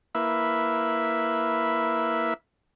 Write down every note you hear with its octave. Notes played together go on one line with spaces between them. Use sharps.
A#3 E4 B4 E5